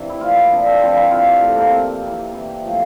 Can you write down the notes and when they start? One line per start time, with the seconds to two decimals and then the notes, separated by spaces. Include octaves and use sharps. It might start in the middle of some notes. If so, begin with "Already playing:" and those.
Already playing: C3 E3 D4
0.09 E4
0.20 A#2 F3 F4
0.36 E4
0.50 C3 F3 D4
0.66 C4
0.81 A#2 F3 C4
0.97 E4
1.11 C3 E3 F4
1.27 G4
1.41 A2 E3 A4
1.56 A#3
1.64 C4
1.72 C3 F3 A#3
2.02 C3 E3
2.33 C3 E3
2.63 A2 F3